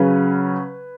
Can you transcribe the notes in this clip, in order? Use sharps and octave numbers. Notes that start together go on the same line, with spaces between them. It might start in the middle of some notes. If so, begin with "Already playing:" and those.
Already playing: C#3 F#3 C#4 B4